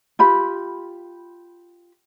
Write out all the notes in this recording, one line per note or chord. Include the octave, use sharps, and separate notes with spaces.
F4 G4 B5